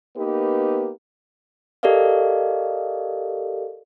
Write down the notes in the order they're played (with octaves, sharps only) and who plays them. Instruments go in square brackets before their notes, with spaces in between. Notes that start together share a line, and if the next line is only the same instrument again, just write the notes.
[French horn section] A#3 B3 D#4 G4 B4
[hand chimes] G4 A4 A#4 D5 D#5 F5